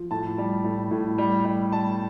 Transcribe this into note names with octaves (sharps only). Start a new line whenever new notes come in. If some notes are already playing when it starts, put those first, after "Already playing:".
Already playing: F3
A2 A5
G3
A2
A2
G3
G3
G3 A5